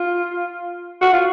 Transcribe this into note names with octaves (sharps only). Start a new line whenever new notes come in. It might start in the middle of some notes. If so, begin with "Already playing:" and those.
Already playing: F4
F#4
F4